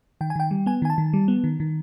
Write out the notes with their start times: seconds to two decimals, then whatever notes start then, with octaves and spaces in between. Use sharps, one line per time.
0.21 D#3 G5
0.30 G#5
0.36 D#3 G5
0.51 G3
0.66 B3 G#5
0.82 D#3 G#5
0.90 A5
0.98 D#3
1.13 G3
1.28 B3
1.44 D#3
1.60 D#3